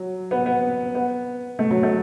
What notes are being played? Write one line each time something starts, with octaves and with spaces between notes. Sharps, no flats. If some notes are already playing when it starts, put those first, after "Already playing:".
Already playing: F#3
B3
B3
B3
A3
F#3
A3